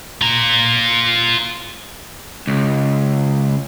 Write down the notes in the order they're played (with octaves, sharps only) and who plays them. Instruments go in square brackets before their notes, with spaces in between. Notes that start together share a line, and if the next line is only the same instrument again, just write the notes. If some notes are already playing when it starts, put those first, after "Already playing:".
[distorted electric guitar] F4 A#5
[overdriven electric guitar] C#2